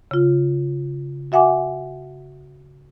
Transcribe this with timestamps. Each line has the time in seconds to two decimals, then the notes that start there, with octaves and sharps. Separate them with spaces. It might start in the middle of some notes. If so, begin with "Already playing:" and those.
0.11 C#3 F4
1.32 F#4 E5 F#5 G#5 D6